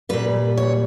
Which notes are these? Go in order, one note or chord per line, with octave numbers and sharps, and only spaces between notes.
A#2 G3 B4
C#5